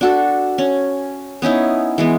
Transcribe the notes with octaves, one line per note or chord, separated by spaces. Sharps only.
D4 F#4 A4
C#4
B3 C#4 D#4 E4
E3 G#3 B3